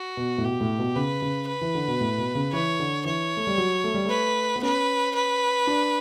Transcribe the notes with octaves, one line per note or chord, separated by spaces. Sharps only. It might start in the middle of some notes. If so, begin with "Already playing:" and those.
Already playing: F#4
B2
A2
B2 G4
A2
B2
C#3 B4
C#3
B4
E3
D3
B2
A2
B2
C#3
E3 C#5
D3
E3 C#5
A3
G3
F#3
A3
G3
A3 B4
B3
C#4 B4
B4
D4